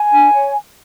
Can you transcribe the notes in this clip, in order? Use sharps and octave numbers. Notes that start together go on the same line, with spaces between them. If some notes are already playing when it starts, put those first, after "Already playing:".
Already playing: G#5
D4
C#5